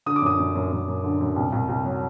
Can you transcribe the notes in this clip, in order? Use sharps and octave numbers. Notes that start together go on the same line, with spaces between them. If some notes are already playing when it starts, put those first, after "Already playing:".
D3 D#6
D6
F#2 D#6
F#2
F#2
F#2
F#2
D3
F#2
C2
C2
C2
F#3